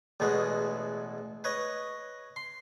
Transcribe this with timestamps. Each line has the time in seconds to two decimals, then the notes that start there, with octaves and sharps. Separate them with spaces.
0.20 A1 E2 B2 G#3 B4
1.44 B4 C#5 D#5
2.36 C6